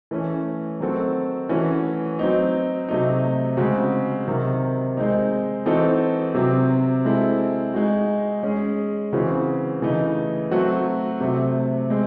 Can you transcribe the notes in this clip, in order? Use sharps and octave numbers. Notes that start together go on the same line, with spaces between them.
E3 A3 C#4
D#3 F#3 C4 F#4 A4
E3 A3 C#4 F#4
F#3 C4 D#4
C3 F#3 A3 D#4
C#3 G#3 C4 F#4
C3 D#3 F#3
G#3 C4 D#4
E3 C4 D#4 F#4 A4
C3 F#3 C4
G#3 C4 E4 A4
G#3 D#4 F#4
G#3 C#4 G#4
C#3 E3 C4 F#4
C#3 E3 A3 D#4
F#3 A3 C4 F#4
C3 F#3 A3
G#3 C4